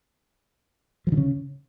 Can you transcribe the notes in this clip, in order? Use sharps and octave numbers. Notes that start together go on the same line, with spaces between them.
F3
D3
C#3